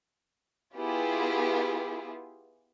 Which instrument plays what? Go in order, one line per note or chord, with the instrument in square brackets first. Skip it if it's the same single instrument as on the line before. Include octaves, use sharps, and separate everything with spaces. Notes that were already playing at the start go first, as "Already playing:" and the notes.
[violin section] B3 E4 F4 G4 G#4